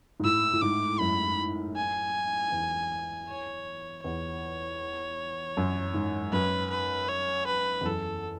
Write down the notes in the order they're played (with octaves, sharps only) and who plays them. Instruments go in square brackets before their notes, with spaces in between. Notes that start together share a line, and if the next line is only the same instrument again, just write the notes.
[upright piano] G#2
[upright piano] A2 [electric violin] E6
[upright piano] A2
[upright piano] G#2 [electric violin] D6
[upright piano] F#2 [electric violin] B5
[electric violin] G#5
[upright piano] E2
[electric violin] C#5
[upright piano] E2 [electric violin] C#5
[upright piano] F#2
G#2
[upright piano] F#2 [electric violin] B4
[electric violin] B4
C#5
B4
[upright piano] E2
[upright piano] F#2 [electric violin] A4